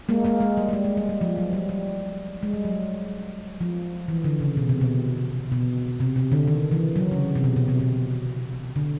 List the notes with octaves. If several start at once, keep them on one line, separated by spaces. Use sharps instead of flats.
G#3 A#3
G#3 A#3
G#3
G3
G3
G#3
G#3
G3
G3
F3
F#3
G3
G3
G#3
G3
F#3
F3
E3
D3
C#3
B2
C3
B2
B2
C3
C3
D3
D#3
E3
F#3
C#3
C3
B2
B2
C3
B2
D3